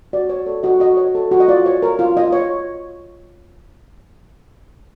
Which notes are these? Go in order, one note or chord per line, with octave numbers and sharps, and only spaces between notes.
F#4 D5
C#5
A4 D5
F#4 D#5
F#4 D#5
C#5
A4
F#4
D#5
F4 D5
C#5
A#4
F4
F4 D#5
C#5